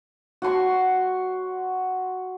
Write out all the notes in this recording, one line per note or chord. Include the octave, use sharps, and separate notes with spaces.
F#4 F#5 C6 C#6